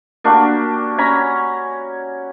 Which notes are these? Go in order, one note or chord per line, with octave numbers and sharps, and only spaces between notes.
A#3 D4 F#4 G4
C#4 G#5 A#5 B5